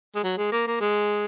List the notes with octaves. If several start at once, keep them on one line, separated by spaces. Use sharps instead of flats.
G#3
F#3
G#3
A#3
A#3
G#3